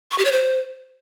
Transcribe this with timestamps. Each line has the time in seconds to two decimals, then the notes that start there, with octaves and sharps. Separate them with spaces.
0.11 C#6
0.18 G4
0.25 C#5
0.32 C5